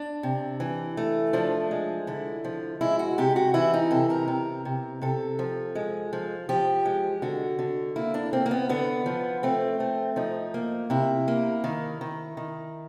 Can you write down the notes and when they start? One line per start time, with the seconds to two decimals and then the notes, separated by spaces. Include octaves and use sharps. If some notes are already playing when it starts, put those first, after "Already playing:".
Already playing: D4
0.23 C3
0.60 E3
0.97 A3
1.33 F3 D4
1.71 G#3
2.07 D3 E4
2.45 F3
2.81 G#3 E4
2.99 F#4
3.18 C3 G4
3.36 F#4
3.54 E3 E4
3.74 D#4
3.91 C3 A4
4.10 A#4
4.28 C3
4.65 C3
5.02 C3 A4
5.39 F3
5.75 G#3
6.13 F3
6.49 F3 G4
6.85 G#3
7.22 D3 F#4
7.59 D3
7.96 A#3 E4
8.14 D4
8.33 A#3 C4
8.46 A#3
8.51 B3
8.69 D3 B3
9.06 F3
9.43 A3 C4
9.80 A3
10.16 F3 D#4
10.54 A#3
10.90 C3 E4
11.28 A#3
11.64 D#3
12.01 D#3
12.37 D#3